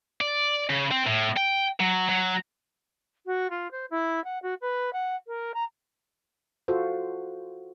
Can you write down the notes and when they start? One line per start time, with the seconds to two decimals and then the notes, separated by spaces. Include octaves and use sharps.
0.21 D5
0.70 C#3
0.91 C4
1.07 A2
1.36 G5
1.80 F#3
2.09 F#3
3.26 F#4
3.50 F4
3.71 C5
3.90 E4
4.24 F#5
4.42 F#4
4.61 B4
4.93 F#5
5.27 A#4
5.54 A#5
6.68 F4 F#4 A4 C5